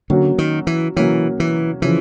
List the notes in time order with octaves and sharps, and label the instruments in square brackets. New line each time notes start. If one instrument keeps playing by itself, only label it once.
[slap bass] D3 [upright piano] F#3 A#3 C#4 F#4
[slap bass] D#3
E3
[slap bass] E3 [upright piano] F#3 A#3 C#4 F#4
[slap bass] E3
[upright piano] C#3 F3 [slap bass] E3